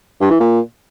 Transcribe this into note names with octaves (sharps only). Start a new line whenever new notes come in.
G2
E3
A#2